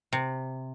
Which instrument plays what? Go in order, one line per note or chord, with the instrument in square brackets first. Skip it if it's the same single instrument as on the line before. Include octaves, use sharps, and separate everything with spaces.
[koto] C3